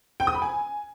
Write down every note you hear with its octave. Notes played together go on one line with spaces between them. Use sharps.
G5
D#6
B5
G#5